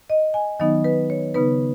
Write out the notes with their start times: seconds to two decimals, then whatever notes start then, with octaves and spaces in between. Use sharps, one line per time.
0.10 D#5
0.34 G#5
0.60 D#3 F#3 B3 D#4 D#5
0.84 B4
1.10 C#5
1.35 C#3 B3 D#4 B4